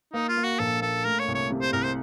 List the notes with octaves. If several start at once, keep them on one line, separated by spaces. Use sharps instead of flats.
A#3 D#4
F4
A#3
F#4
A#1 A4
A#3 A4
A3 A#4
C#5
C2
C#5
C3
C5
C2 A#4
C5